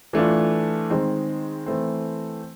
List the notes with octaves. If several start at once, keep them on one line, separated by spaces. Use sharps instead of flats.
E3 A3 D4 F4
D#3 G#3 C4
E3 A3 C4